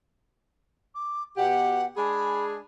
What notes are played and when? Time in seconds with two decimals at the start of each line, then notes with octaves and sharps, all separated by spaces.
0.95 D6
1.37 B2 G4 F#5
1.97 G#3 D4 G#4 B5